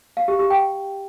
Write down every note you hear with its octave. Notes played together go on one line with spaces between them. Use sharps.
F5
G4
G4
G5